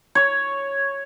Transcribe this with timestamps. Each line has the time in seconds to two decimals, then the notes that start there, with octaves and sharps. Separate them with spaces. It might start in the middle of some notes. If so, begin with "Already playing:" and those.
0.15 C#5